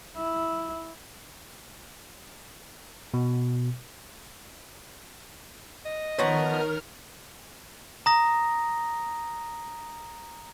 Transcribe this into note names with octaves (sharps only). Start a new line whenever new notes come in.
E4
B2
D#5
D#3 F3 B3 A#4 C#5 A#5 F6
A#5 D#6 A#6